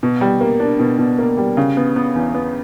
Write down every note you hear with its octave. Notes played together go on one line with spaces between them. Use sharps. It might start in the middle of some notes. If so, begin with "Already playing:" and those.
B2
G3
A#3
D4
B2
B2
A#3
G3
C#3
B3
B3
E2
B3